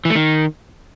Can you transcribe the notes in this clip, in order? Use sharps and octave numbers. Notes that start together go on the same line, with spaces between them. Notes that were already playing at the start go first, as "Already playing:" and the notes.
E3
A3
D#3